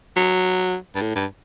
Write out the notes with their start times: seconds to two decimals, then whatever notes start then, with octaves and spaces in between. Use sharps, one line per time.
0.17 F#3
0.95 G2
1.02 A2
1.15 G2